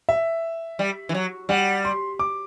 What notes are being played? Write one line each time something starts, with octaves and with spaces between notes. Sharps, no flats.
E5
G3
E3
F#3
G3 F#5
C6
D6